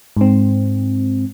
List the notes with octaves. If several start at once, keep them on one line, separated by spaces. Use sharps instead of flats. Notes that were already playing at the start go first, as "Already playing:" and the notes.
G#2 C4